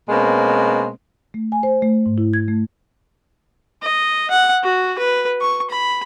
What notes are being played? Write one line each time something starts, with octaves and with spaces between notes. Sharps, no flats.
B2 G#3 A#3 C4 C#4
A3
G#5
C5
A3
G#2
E4
G#6
A3
D#5
F#5
F#4
B4
C#6
B5